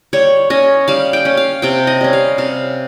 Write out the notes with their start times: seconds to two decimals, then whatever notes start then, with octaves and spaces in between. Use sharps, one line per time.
0.13 G3 C#5
0.50 C#4 D#5
0.88 G3 F5
1.13 G5
1.25 C#4
1.37 F5
1.62 C3 G5
1.87 D#5
2.01 G3 C#4
2.13 F5
2.38 C3 F5